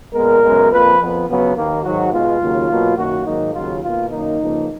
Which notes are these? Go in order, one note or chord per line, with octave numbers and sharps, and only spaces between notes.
A#2 G#3 B3 A#4
F#2 C#3 G#3 B3
F2 F3 A#3 B4
F2 F3 B3
C#2 C#3 F#3 B3
D#2 D#3 A#3
G#2 D#3 F#3 F#4
B2 G#3 B3 F4
D#2 C#3 F#3 A#3
B2 F#3 A#3
F#2 D#3 A#3 F#4
G#2 D#3 F#3 A#3 D#4
D#2 C#3 F#3 F4
B2 A#3 F4
F#2 D#3 A#3 D#4
C#2 C#3 F3 A#3